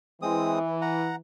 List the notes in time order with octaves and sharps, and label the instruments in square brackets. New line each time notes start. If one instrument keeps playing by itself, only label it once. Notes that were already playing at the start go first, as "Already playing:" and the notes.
[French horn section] E3 [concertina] G#3 C4 D#6
[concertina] F#5 A#5